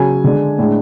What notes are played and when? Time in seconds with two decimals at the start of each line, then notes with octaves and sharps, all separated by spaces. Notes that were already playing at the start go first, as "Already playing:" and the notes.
Already playing: C#3 F#3 G#5
0.24 D3 G#3 D4
0.59 A2 G#3 D4